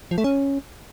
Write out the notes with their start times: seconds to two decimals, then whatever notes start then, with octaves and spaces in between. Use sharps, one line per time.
0.11 F3
0.18 A3
0.24 C#4